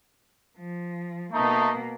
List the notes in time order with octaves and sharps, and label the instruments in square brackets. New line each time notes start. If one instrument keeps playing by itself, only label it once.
[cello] F3
[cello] B2 A#3 [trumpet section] A3 D#4